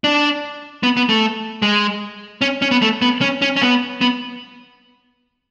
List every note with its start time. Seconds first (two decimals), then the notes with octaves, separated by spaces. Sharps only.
0.04 D4
0.83 B3
0.97 B3
1.09 A3
1.62 G#3
2.41 C#4
2.62 C#4
2.71 B3
2.82 A3
3.02 B3
3.21 C#4
3.42 C#4
3.56 C#4
3.62 B3
4.01 B3